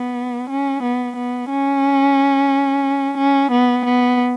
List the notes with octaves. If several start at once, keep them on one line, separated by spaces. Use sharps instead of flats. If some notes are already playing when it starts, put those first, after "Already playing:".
Already playing: B3
C#4
B3
B3
C#4
C#4
B3
B3